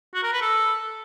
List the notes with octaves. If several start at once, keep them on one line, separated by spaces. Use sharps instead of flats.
F#4
A#4
B4
A4